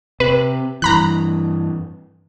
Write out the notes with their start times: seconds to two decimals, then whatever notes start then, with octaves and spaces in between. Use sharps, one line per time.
0.20 C3 B4
0.82 G2 E3 A#5 B5 F#6